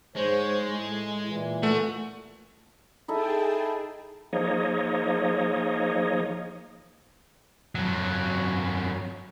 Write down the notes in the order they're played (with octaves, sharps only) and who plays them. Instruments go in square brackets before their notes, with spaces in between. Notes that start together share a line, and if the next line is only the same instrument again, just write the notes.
[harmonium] G#2 C5 C#5 [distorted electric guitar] G#3
[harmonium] A2
A#2 E3
[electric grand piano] A3 [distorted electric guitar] F#4
[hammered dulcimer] D#4 E4 A4 [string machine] G#4 G5 A5
[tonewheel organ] F3 A#3 D#4 G#4 C#5 D#5
[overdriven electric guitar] F2 F#3